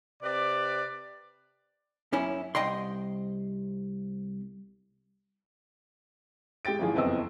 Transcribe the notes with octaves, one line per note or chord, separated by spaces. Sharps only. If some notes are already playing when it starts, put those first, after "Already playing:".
C3 B4 D5
F#2 C#4 E4
C2 D#5 G5 C6
G#3 G4 G5 A6 D7
G#1 E3 F3 G#4
F#1 F2 E3 B3 D#5 E6